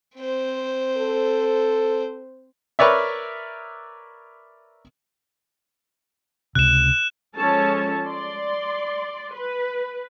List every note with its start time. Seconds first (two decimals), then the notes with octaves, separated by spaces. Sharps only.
0.17 C4 C5
0.97 A4
2.79 A#4 B4 C#5 D5 E5
6.55 C#2 C3 F#6 E7
7.36 F3 G#3 C#4 A4 C#5 A5
8.07 D5 C6
9.33 B4